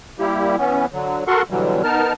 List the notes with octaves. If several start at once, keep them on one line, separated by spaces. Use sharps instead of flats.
G3 A#3 E4 G4
E3 B3 C#4
D3 F#3
F#4 A4 A#4 F#5 C6 C#6
B2 D3 E3 F#3 G3
B3 D#4 A#4 A5 F6